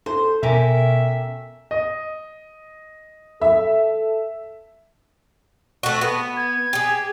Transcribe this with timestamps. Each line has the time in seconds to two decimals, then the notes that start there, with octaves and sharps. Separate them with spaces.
0.06 A4 C5
0.43 B2 C#4 G4 A#4 E5
1.71 D#5
3.42 A4 E5
5.83 A3 F#4
6.01 B3
6.37 G#6
6.73 G4 G#4